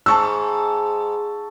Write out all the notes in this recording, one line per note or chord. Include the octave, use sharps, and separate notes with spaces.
G#2 A5 C#6 E6